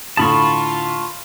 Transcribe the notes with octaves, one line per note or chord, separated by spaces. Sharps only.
A2 D3 F4 A5 B5 C#6 D#6